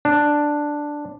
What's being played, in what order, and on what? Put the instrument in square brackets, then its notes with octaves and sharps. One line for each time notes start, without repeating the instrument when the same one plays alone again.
[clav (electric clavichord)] D4